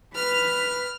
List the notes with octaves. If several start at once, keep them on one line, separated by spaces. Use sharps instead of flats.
B4 F6